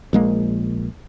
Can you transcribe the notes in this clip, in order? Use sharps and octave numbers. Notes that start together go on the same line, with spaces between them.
A#1 G#3 A#3